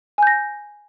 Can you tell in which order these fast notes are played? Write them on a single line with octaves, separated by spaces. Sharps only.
G#5 G6 A#6